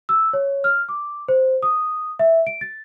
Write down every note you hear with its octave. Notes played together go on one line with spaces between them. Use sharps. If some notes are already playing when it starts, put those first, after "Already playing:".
E6
C#5
F6
D6
C5
D#6
E5
D7
A6